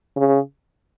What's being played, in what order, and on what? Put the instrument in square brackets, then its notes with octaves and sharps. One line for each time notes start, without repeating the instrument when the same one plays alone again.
[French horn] C#3